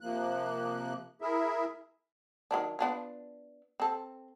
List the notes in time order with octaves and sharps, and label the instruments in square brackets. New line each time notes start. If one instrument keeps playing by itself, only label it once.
[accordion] C3 F3 A#3 F#6
E4 G#4 A#4 E5
[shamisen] D#3 F#3 D4
B3 D4 F4
C4 A4